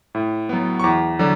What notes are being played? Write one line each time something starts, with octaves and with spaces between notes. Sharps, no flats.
A2
F#3 B3
C#6
E2 D6
D3 F#3